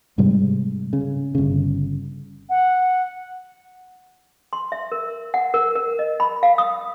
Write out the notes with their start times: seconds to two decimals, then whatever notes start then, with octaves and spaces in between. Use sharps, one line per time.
0.18 G#2 C3 G3 G#3
0.93 C#3
1.35 G1 C#3
2.49 F#5
4.53 C6
4.72 E5
4.92 A#4
5.34 F#5
5.54 A#4
5.75 A#4
5.99 D#5
6.20 B5
6.43 F5
6.58 D#6